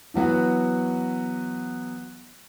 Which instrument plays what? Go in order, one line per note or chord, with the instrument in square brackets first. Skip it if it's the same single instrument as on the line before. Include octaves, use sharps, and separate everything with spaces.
[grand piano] E3 F#3 B3 F#4